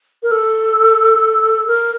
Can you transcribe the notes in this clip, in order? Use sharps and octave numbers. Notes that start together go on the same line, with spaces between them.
A#4
A4
A#4